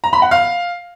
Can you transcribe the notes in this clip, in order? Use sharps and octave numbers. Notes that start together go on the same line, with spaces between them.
A#5
B5
F#5
F5